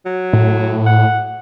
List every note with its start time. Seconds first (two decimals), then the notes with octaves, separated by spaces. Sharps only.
0.06 F#3
0.33 A2
0.86 F#5